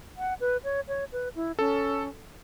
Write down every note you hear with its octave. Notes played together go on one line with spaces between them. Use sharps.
F#5
B4
C#5
C#5
B4
E4
C#4 A4